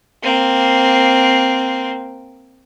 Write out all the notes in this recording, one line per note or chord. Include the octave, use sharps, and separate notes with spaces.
A#3 C4